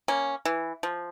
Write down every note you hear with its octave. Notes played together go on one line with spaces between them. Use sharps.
A#3 C#4
E3
F3